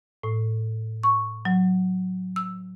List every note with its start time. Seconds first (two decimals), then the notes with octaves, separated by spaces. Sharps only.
0.23 A2
1.03 C#6
1.45 F#3
2.36 E6